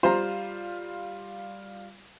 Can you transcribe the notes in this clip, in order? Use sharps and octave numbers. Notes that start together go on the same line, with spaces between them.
G3 F4 C5 A#5